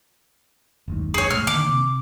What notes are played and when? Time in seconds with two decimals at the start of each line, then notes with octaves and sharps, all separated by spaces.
0.88 F#1 D#2 G#2
1.14 G#4 C#5
1.30 A#2 G#3 A3 F6
1.47 D3 D#3 A#3 D6
1.69 C3